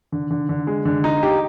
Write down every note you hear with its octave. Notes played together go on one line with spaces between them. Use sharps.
D3
D3
D3
G#3
D3
D#4
G4